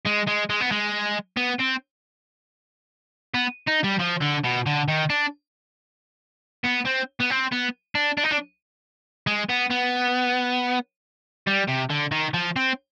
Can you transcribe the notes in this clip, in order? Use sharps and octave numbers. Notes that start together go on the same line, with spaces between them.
G#3
G#3
G#3
B3
G#3
B3
C4
B3
D#4
G3
F3
D3
B2
D3
D#3
D4
B3
C4
B3
C4
B3
D4
D4
D#4
D4
G#3
B3
B3
G3
C3
D3
D#3
F3
C4